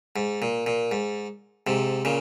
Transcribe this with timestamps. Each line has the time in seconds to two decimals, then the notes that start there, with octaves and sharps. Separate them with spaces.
0.16 G#2
0.42 A#2
0.66 A#2
0.92 G#2
1.67 G#2 C3
2.05 A#2 C#3